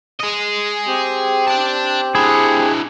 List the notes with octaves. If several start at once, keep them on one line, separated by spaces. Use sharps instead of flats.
G#4 D#5
C4 G4 G5
D5 A5
D4 E4 G#4